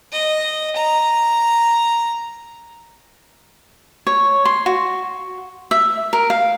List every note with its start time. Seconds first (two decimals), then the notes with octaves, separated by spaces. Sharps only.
0.12 D#5
0.76 A#5
4.07 C#5
4.45 C6
4.66 F#4
5.71 E5
6.13 A#4
6.30 F5